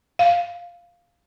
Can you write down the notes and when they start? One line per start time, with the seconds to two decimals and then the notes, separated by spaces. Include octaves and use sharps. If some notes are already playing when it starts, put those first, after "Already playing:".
0.19 F5